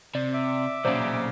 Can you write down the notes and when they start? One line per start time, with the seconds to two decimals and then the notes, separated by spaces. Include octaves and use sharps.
0.15 C3 D5
0.34 E5 D6
0.85 B1 A#2 C#3 F#3 C5 D5